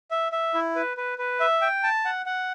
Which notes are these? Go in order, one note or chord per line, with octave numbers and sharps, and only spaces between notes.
E5
E5
E4
B4
B4
B4
E5
G5
A5
F#5
F#5